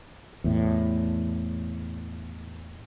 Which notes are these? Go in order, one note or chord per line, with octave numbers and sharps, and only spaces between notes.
E2 A2